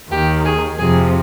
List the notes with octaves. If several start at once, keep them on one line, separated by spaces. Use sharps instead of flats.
D#2 D#3 G4
G#4
F2 C3 F3 G#4